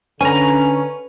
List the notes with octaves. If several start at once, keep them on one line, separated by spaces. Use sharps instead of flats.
D3 C#4 B4 G#5 A#5